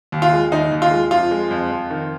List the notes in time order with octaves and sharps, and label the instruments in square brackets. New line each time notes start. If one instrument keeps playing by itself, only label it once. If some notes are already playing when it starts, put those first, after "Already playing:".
[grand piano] D#2
F4
G#3
D#2 D#4
D#2
F4
G#3
F2 F4
G#3
F2
F2
D#3